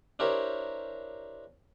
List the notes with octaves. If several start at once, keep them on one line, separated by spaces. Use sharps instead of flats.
D4 E4 G4 A#4 C5 C#5